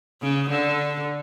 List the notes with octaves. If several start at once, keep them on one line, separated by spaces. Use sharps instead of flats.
C#3
D3